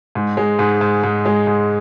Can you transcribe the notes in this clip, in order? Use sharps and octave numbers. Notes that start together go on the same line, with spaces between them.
G#2
G#3
G#2
G#2
G#2
G#3
G#2